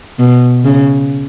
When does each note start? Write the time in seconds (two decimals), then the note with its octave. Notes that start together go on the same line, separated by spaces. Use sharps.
0.19 B2
0.65 C#3